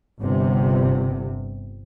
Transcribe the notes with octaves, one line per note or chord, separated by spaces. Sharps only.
G1 C3